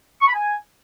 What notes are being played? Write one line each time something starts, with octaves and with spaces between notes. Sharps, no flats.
C#6
B5
G#5